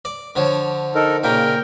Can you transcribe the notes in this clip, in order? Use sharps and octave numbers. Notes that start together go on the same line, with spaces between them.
D5
D3 F3 C#5
D#4 A4 A#4
A#2 C#3 A#4 G5